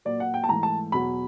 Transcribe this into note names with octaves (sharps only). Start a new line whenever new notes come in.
A#2 F#3 A#3 D5
F#5
G5
A5
G#2 E3 A3 A#5
A5
E2 B2 F#3 B5